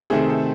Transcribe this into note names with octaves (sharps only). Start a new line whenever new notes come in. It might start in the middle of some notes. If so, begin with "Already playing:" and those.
C3 D#3 A3 C4 G#4
A4